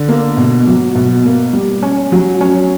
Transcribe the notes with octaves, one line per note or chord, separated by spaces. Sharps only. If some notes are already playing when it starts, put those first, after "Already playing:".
Already playing: D3
A#3
B2
F#3
B2
A#3
G3
C#4
F#3
C#4